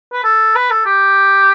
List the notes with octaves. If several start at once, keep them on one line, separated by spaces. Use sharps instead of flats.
B4
A4
B4
A4
G4